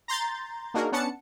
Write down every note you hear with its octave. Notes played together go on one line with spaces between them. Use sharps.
A#5 C6 G6 A6
A#3 D4 D#4 F#4 G#4 A#4
B3 C#4 D4 F#5 A5 C#7